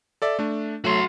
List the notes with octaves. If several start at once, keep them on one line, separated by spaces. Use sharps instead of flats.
A4 D5 E5
A3 D4
F#3 A3 F#4 C6